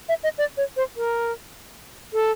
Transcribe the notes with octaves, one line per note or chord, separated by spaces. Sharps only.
E5
D#5
D5
C#5
C5
A#4
A4